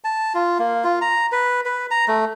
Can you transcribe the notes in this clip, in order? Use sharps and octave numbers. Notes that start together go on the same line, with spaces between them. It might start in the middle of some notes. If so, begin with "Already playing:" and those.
A5
F4
A#3
F4
A#5
B4
B4
A#5
A3